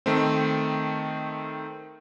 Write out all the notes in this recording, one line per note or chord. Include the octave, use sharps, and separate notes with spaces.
D#3 A3 C4